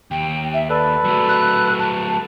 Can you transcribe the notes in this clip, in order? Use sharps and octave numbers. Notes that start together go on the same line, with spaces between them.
D#2 G5
E5
A4 B4 D5
F#3 A3
F#6
A5